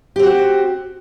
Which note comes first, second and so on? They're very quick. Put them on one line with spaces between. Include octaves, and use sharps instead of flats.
G4 C4 F#4